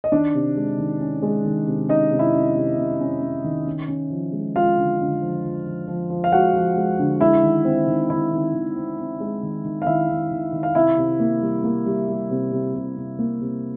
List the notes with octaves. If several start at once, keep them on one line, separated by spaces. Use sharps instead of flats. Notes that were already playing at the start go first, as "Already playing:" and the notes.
D#5
D#3 D4 D5
C3
G#3
D#3
C#4
G#3
D#3
C3
C#4 D#4 D#5
C3
E4 E5
C#4
C3
C3
C#4
C#4
D#3
C#4
C#4
F3
G#3
G#3 F4 F5
D3
D3
F3
F3
F3
F3
F3
F5
G#3 F#4 F#5
F3
G#3
D3
G#3 E4 E5
D#3
C4
D#3
D#3 E4 E5
D#3
D#3
C4
C4
G#3
D#3
D#3
F5
D#3 E4 E5
D#3
D#3
D#3
F5
C3 E4 E5
C3
A#3
G3
A#3
G3
G3
C3
C3
C3
C3
A#3
C3